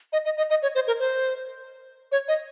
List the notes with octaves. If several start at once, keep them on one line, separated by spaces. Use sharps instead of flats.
D#5
D#5
D#5
D#5
C#5
C5
A#4
C5
C#5
D#5